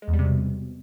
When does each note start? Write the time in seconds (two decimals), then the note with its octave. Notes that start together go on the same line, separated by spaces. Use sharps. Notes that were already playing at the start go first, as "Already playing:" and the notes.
0.02 G#3
0.08 E2
0.13 G3
0.19 C3
0.24 B2